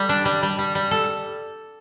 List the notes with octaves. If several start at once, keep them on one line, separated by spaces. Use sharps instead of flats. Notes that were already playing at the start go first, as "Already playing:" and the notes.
Already playing: G3 A4
D4
G3
G3
G3
G3
A4